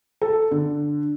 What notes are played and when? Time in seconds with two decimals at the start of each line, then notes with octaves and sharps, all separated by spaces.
0.21 A4
0.51 D3